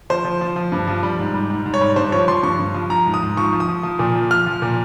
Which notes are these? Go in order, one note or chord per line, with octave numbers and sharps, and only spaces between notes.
F3 C5
F3
F3
F3
G2
F3
G3
G#2
G3
G#2
G#2
C#5
G3
G2 C5
F3 C#5
F3 C6
G2 C#6
G2
F3
F3 A#5
G#2
D#6
G#2
F3 C#6
F3
D#6
F3
F3
A#2
F3
F3 F6
F3
A#2